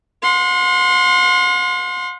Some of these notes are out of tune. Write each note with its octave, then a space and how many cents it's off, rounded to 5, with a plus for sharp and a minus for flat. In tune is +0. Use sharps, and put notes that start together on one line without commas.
F#5 -45 C6 +0